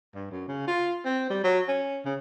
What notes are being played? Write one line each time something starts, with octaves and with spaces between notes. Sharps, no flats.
G2
F#2
C#3
F4
C4
G3
F#3
C#4
C#3